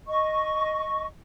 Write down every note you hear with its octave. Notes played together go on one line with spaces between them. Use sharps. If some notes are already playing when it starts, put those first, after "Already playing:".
D#5 C#6